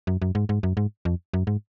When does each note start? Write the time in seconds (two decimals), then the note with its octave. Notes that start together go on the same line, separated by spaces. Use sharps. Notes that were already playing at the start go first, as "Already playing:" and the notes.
0.07 F#2
0.22 F#2
0.35 G#2
0.49 G#2
0.63 F#2
0.77 G#2
1.05 F2
1.33 F#2
1.47 G#2